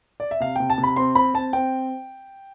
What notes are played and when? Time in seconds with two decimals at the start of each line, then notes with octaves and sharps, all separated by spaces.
0.20 D5
0.31 E5
0.40 C3 F5
0.56 C3 G5
0.70 A5
0.78 C3
0.83 B5
0.96 C4 C6
1.15 C4 B5
1.34 C4 A5
1.53 C4 G5